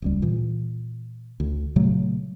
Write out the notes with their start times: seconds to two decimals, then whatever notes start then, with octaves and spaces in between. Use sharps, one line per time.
0.02 D#1 C#2 G3
0.22 A#2 E3
1.40 D2
1.76 A#2 C#3 F#3 A3